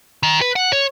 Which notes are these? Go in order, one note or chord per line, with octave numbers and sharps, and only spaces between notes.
D#3
B4
F#5
C#5